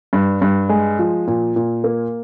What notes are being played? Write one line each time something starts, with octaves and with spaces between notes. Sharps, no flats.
G2
G2
G#3
F3
A#2
A#2
A#3